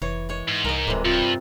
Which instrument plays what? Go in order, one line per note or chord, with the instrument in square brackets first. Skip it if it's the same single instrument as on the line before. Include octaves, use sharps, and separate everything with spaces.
[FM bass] F1 [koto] E3 C#5
[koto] G#3 C#5
[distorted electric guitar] G#2
[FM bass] C2 [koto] A#4 D#5
[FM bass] D1 [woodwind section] A2 E3 G#3 [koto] C3 G3
[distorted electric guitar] G2 [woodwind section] C4 F4